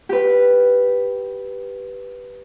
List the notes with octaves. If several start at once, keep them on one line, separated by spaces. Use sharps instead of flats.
G4 B4